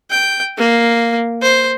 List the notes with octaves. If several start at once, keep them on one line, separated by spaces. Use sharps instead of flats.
G5
A#3
C5